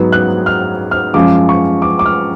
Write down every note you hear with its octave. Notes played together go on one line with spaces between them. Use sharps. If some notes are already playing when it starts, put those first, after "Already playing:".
Already playing: G#2 F#3 B3
F#6
F6
F6
F#2 F3 G#3 D6
C#6
D6
D6
F6